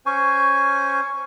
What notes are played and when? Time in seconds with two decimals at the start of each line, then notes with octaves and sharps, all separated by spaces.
0.06 C#4 C5 G#5 C#6